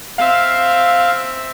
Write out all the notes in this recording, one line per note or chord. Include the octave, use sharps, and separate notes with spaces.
C4 E5 F5